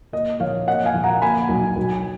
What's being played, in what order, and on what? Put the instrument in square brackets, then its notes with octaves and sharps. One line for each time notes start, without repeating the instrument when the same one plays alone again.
[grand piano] A#3 D#5
A#1 C#5 F5
A#3 D#5 F#5
F5 G#5
A#1
F#5 A#5
A#3 G#5 B5
B1
B1